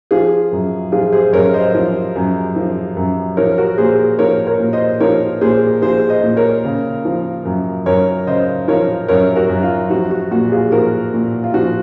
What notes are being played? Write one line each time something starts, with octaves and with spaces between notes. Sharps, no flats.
F3 F4 G#4
F#2
F3 F4 G#4
G#4 C5
F#2 A#4 C#5
C5 D#5
F3
F#2
F3
F#2
F3 A#4 C#5
F#4 A#4
A#2 G#4 C5
F3 A#4 C#5
A#4 C#5
A#2
C5 D#5
F3 A#4 C#5
A#2 G#4 C5
F3 G#4 C5
C5 D#5
A#2
A#4 C#5
C#3
F3
F#2
F#2 A#4 C#5
C#3 C5 D#5
F3 A#4 C#5
F#2 A#4 C#5
F#4 A#4
F#2
F4
F3 F#4
F#4
A#2 F#4
F4 G#4
F3 F#4 A#4
A#2
F4
F3 F#4